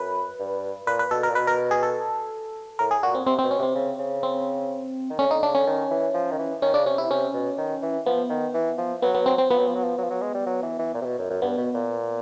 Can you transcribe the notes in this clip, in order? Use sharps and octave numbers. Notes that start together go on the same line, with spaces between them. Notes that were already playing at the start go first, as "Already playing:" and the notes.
Already playing: F#2 B4
G2
A#2 B4
B4
B2 A4
A#4
A#2
B2 B4
A#4
G#4
A4
A2 A#4
G#4
A#2 F#4
C4
C3 C4
B2 C4
C#4
C3 C4
C#3
C#3
C4
D#3
D3 C#4
C#3
D3 D#4
C#3 D4
D3 C#4
D#3
E3
F3
D#3
E3
D#3 C#4
C#3 D4
C3 C#4
C3 E4
C3 C#4
B2
D#3
E3
F3 B3
D#3
E3
F3
F#3 B3
B3
C4
C4
F3 B3
F#3
F3
F#3
F3
F#3
F3
F#3
G#3
G3
F#3
E3
E3
A#2
C3
B2
F#2
F#2
G2 B3
B2
A#2